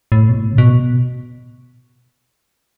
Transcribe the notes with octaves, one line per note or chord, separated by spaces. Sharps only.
A2
B2
A2
C#3
B2